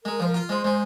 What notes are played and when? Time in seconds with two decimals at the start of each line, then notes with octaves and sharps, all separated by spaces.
0.04 G#3 A#4
0.20 F3 C5
0.27 A#4
0.34 F4
0.49 G#3 C5
0.64 G#3